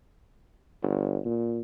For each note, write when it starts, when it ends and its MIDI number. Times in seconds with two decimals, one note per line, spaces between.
0.82 1.19 31
1.25 1.60 46